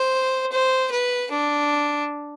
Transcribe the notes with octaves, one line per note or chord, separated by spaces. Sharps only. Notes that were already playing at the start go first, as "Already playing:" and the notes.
Already playing: C5
C5
B4
D4